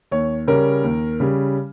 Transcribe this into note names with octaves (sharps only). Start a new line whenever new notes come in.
D#2 C#5
C#3 G3 C#4 A#4
D#2
C#3 G3 C#4